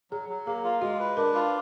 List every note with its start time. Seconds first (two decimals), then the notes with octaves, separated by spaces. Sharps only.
0.11 F#3 G#4
0.29 F#3
0.46 A#3 G#4
0.64 F4
0.82 G#3 F#4
0.99 B4
1.17 D4 A#4
1.35 F4